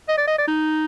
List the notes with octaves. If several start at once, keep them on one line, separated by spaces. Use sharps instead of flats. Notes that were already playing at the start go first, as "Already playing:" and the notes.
D#5
D5
D#5
D5
D#4